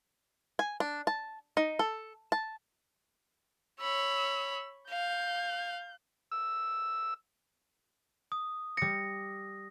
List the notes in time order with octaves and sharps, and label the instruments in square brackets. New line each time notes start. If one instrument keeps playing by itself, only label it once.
[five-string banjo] G#5
D4
A5
D#4
A4
A5
[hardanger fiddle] C#5 B5 [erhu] E6
[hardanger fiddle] F5 [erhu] G6
[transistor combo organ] E6
[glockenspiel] D#6
[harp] G3 C#7 [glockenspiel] A#6